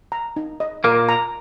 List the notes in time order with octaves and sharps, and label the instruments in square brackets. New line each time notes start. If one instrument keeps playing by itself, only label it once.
[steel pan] A#5
D#4
D#5
[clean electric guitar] A#2 A#3 [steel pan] A#4
[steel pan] A#5